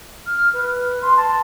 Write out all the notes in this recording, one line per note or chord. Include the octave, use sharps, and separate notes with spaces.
F6
B4
C6
A5